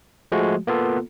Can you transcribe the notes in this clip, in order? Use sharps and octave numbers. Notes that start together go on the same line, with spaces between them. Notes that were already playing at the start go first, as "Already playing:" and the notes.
F3 G#3 A3 F#4
A#3 B3 F4 A4